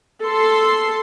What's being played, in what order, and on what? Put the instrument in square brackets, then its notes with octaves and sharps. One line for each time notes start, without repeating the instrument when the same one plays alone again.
[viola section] A4 C6